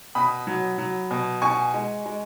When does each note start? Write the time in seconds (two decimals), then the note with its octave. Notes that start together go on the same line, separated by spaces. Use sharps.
0.15 B2 B5 D#6
0.47 F#3
0.78 F#3
1.11 B2
1.42 B2 G#5 C#6
1.74 G#3
2.06 G#3